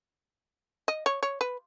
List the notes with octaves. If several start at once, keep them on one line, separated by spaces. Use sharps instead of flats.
D#5
C#5
C#5
B4